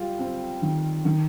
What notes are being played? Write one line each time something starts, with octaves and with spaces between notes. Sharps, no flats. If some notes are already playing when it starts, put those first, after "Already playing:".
Already playing: G3 F4
C4
D#3
D#3